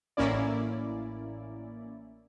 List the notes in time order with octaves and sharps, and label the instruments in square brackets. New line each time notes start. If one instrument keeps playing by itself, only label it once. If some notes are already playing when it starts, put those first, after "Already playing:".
[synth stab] A1 A#3 C#4 E4 D5